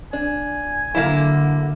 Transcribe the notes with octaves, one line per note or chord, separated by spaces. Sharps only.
D4 G#5
D3 F#3 A#3 E4 F5